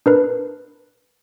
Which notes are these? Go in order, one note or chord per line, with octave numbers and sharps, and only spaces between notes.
D4 A#4 B4